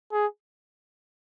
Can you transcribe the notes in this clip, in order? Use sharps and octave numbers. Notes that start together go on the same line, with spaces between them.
G#4